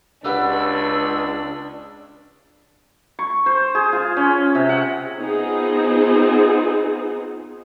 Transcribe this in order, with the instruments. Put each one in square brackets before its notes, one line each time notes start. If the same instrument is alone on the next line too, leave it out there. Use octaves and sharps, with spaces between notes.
[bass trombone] C#2 [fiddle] D4 [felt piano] G4 B4 F#5 [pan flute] E6
[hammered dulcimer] C#6
C5
G#4
F4
C#4
C3
F#5
[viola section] B3 C4 D#4 F4 G#4